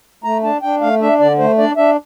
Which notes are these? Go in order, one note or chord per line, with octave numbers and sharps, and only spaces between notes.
A3 A#5
D4 A5
D4 G5
A3 F5
D4 E5
D3 D5
A3 C5
D4 D5
D4 E5